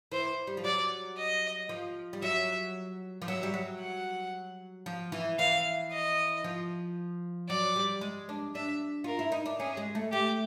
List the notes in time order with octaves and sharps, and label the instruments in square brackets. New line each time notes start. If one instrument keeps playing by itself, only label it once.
[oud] E3 [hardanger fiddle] C5
[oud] G3
F3
[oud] F#3 [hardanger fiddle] D5
[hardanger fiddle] D#5
[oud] F3
G3
[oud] F#3 [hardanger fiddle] E5
[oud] F3
[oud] F#3 [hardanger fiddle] E5
[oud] G3
F#3
[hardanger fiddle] F#5
[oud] F3
E3
[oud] E3 [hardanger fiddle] F5
[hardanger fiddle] D#5
[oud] F3
[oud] F#3 [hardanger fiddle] D5
[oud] G3
G#3
D4
[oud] D4 [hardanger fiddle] E5
[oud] F4 [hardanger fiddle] A#4
[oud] E4
D#4
D4
[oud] C#4 [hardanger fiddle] G#4
[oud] G#3
A3
[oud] A3 [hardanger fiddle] G4